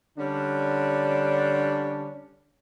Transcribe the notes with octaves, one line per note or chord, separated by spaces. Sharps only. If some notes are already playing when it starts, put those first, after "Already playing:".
D3 G3 C#4 D4